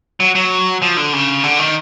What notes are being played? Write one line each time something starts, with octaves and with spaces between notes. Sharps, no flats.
F#3
F#3
F3
D3
C#3
D3
D#3